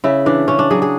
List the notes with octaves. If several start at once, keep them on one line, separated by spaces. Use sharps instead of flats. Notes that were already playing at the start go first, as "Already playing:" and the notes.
C#3 E4
E3 D4
C#3 C#4
D4
F#3 G#4
G#4